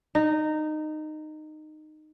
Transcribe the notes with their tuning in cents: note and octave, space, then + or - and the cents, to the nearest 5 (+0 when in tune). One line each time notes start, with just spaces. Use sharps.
D#4 -15